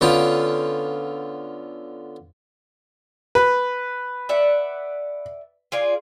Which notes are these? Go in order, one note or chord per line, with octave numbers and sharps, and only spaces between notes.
D3 B3 C#4 F4 G5
B4
D5 E5 F#5
F4 G#4 D5